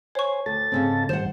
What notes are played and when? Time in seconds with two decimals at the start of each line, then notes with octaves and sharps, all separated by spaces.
0.15 C5 C#5 G#5 C#6
0.46 D2 A4 A5 A6
0.72 G#2 C#3 C4
1.09 G#2 D#3 G3 C5 F#5 E7